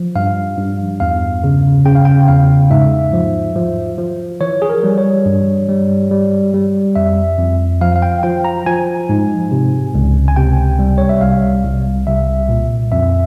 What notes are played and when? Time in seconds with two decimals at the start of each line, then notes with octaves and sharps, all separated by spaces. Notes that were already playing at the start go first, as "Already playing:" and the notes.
Already playing: F3
0.15 G2 F5
0.58 G2
1.00 E2 F5
1.44 C#3
1.86 C#3 G5
1.95 F5
2.05 G5
2.28 E2 F5
2.70 G#2 E5
3.13 F3
3.56 F3
3.98 F3
4.41 E3 C#5
4.62 G#4
4.69 A#4
4.84 G3
4.98 C#5
5.26 G2
5.69 G3
6.11 G3
6.54 G3
6.96 F2 E5
7.39 F2
7.81 F3 F5
7.96 F5
8.02 G5
8.23 F3 G5
8.45 A#5
8.66 F3 G#5
9.09 G#2
9.51 C3
9.94 C#2
10.28 G#5
10.36 C3 G5
10.79 G3
10.98 C#5
11.09 E5
11.21 C2 F5
11.64 C2
12.06 C2 E5
12.49 A#2
12.92 F2 E5